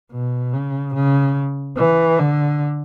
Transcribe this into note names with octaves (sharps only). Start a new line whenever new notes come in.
B2
C#3
C#3
E3
D3